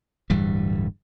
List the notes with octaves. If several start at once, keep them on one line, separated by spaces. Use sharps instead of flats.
D1 G2 E3 G3